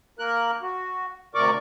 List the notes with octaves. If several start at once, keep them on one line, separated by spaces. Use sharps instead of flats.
A#3 A#4 F#6
F#4
D2 C3 A#4 D5 C#6 D6